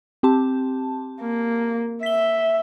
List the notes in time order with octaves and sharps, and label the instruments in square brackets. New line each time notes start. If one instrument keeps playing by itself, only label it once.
[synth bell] C4 G4 A5
[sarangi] A#3
[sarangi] E5 [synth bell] B6 G7